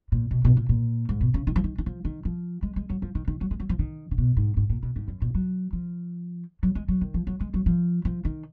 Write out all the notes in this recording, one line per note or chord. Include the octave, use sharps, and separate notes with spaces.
A#2
B2
B2
A#2
A#2
G#2
B2
C#3
D#3
F3
D#3
D#3
F3
D#3
F3
G#3
G#3
F#3
F3
D#3
D#3
F#3
G#3
F#3
F3
D#3
C#3
B2
G#2
G#2
A#2
B2
G#2
F#2
A#2
F#3
F3
F#3
G#3
F#3
D#3
F3
F#3
G#3
F#3
F3
F3
D#3